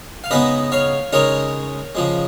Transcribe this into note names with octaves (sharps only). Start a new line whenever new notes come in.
F5
C#3 G#3 B3 D#4 B4 D#5
C#5 F5
C#3 G#3 D#4 A#4 C#5
C#3 F3 G#3